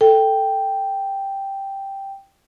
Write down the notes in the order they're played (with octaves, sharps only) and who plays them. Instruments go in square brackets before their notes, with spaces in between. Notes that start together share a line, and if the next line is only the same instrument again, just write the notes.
[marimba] A4 [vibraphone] G5